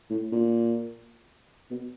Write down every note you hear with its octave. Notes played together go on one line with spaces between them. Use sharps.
A2
A#2
B2